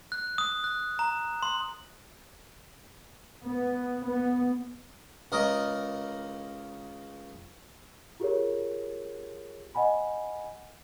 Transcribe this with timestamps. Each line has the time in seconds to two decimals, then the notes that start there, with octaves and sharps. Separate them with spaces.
0.12 F#6
0.38 D#6
0.64 F#6
0.99 A#5
1.43 C6
3.43 B3
4.05 B3
5.32 C#2 A#4 D#5
8.20 F4 G4 G#4 A#4 C#5
9.75 D#5 F#5 G#5 B5